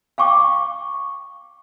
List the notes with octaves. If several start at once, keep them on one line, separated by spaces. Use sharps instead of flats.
F5 G5 C#6 D6